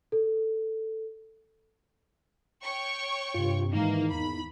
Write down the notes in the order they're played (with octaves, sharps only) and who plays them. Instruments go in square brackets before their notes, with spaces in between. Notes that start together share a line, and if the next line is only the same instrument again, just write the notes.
[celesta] A4
[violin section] C#5 G5 C#6
[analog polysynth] G2 C3 [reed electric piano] F4
[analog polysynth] G#2 D#3 E3 [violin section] A#3 [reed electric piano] D#4
[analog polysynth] E2 [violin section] B5